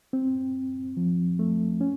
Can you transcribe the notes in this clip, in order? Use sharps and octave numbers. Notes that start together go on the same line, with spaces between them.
C4
F3
A3
C#4